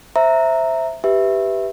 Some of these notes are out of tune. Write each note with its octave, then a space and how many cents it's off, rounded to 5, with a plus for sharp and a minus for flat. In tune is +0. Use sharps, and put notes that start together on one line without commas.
C5 +5 E5 +0 A#5 -10
G4 +0 B4 +0 E5 +0